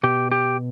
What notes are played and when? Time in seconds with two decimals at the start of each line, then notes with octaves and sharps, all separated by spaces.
0.03 B2 G4
0.31 G4